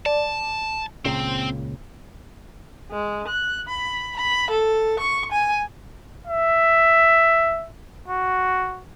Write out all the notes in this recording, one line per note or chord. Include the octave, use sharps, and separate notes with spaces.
D5 A5
C#2 A#2 C#3 C4
G#3
F#6
B5
B5
A4
C#6
G#5
E5
F#4